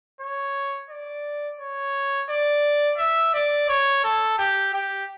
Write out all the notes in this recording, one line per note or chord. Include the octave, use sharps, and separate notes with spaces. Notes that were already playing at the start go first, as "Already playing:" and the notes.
C#5
D5
C#5
D5
E5
D5
C#5
A4
G4
G4